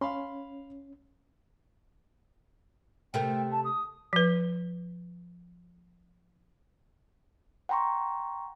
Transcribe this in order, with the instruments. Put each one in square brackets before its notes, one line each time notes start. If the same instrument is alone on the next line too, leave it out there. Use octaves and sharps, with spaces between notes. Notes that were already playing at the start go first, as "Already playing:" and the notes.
[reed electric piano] C#4 [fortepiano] F5 B5 C6
[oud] C3 A3 A#4 [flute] G5
[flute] A5
D#6
[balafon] F3 B4
[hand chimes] F#5 G5 A#5 C6 C#6